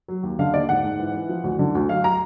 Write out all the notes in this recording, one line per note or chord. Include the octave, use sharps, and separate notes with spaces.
F#3
D#2
D3 F5
D#2 D5
G#2 F#5
G#2
E3
E3
F3
D2
D3
D2
F#3 F5
A#5